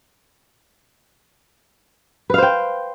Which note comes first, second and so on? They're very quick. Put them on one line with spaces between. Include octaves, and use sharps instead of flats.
B4 F5 C5 G5